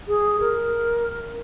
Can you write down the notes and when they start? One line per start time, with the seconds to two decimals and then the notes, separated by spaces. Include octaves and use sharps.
0.08 G#4
0.40 A#4